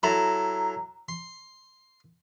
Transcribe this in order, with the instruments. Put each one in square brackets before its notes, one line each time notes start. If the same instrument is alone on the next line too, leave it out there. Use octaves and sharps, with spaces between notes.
[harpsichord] F#3 E4 A4 [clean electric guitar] A#5
[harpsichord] C6